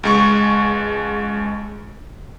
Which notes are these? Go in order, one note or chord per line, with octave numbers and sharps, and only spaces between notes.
C#2 G#3 C#6